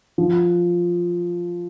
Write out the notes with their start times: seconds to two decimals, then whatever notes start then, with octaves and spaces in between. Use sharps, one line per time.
0.18 F3